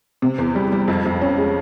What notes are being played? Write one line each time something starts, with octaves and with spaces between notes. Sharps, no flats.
C3
E2
G3
G3
F2
F2
C#4
G#3